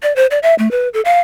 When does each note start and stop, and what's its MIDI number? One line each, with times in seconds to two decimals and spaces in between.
0.03 0.15 74
0.16 0.26 72
0.31 0.39 74
0.43 0.55 76
0.59 0.71 57
0.71 0.89 71
0.94 1.01 69
1.05 1.20 77